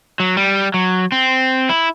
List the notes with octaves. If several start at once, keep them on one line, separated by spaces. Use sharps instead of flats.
F#3
G3
F#3
C4
E4